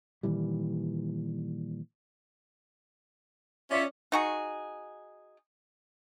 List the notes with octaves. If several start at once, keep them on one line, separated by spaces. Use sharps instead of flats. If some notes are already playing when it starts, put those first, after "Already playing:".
A#2 D#3 E3 G3
C#4 F4 D5 E5
D#4 F#4 G#4